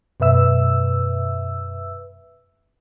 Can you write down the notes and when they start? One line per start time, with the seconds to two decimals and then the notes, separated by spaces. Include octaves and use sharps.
0.20 F#2 B2 B4 E5 E6